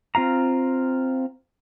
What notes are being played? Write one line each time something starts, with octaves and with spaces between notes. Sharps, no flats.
C4 F4 F5 A#5